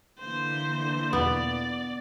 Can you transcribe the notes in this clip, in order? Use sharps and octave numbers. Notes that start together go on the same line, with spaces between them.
D3 E3 A#3 C5
E2 B2 B3 D5